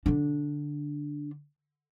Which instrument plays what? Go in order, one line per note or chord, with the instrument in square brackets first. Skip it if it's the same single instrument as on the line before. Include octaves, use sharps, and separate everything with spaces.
[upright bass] D3 D4